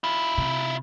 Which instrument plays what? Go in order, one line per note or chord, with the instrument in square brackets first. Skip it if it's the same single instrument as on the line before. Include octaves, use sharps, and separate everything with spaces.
[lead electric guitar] E4 F4
[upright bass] C3